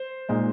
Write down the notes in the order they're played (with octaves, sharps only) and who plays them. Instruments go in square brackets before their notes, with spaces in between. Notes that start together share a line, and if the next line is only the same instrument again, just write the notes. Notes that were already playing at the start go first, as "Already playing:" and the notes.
Already playing: [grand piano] C5
A#2 G#3 D#4